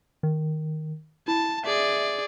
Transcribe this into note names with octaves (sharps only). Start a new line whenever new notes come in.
D#3
E4 A5
G#4 D5 E5